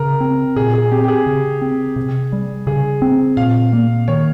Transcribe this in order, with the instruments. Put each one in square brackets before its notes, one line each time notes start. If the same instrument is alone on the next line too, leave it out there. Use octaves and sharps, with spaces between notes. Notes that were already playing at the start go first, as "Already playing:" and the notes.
Already playing: [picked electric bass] C#3 [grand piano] A#4
[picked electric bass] C4
[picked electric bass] A#2 [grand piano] G#4
[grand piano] G#4
[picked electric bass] C4 [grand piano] G4
[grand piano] G4
G#4
[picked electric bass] C#3
C4
C3
G3
[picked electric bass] C#3 [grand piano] G#4
[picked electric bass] C4
[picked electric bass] A#2 [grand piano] F5
[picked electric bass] A#3
[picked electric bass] D#3 [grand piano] C#5